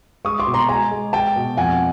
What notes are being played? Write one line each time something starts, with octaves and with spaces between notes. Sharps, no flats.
G#3 C#6 D#6
C6 D6
B2
A#5 C6
G#3 G#5 A#5
G#3
G#3 G5 A5
B2
F2 F#5 G#5